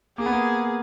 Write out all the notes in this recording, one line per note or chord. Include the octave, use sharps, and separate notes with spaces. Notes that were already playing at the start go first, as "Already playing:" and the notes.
A#3 G#4
B3
A#3